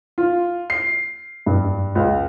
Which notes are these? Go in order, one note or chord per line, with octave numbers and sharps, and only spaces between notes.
F4
C7
G2
C#2